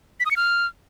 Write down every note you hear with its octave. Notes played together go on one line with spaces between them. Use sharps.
B6
D#6
C#7
F6